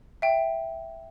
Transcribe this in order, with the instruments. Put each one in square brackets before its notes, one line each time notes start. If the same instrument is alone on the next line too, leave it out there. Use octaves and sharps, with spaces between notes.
[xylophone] E5 G5